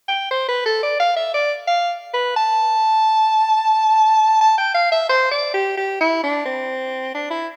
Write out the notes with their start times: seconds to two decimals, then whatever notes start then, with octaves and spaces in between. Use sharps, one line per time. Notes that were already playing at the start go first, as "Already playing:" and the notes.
0.08 G5
0.31 C5
0.49 B4
0.66 A4
0.83 D5
1.00 F5
1.16 E5
1.34 D5
1.68 F5
2.14 B4
2.37 A5
4.41 A5
4.58 G5
4.74 F5
4.92 E5
5.09 C5
5.31 D5
5.54 G4
5.77 G4
6.01 E4
6.23 D4
6.45 C4
7.14 D4
7.30 E4